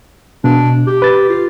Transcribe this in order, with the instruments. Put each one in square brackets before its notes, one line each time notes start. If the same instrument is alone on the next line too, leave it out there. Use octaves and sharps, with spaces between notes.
[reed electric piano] B2 [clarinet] D4
[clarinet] G4
[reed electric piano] B4 A6
[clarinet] F4